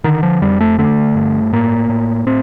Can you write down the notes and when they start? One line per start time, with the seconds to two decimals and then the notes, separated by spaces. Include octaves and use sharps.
0.04 D3 D#3
0.23 F3
0.42 F2 G3
0.61 A3
0.78 D3 A3
1.15 G2
1.52 A2 A#3
1.89 A2
2.26 A2 C4